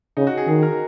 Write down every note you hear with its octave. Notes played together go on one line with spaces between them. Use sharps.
C#3 D#4
F#4
G#4
D#3 G#4
A#4